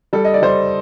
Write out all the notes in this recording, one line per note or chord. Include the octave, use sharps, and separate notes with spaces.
G3 A4
D#5
D5
G3 C5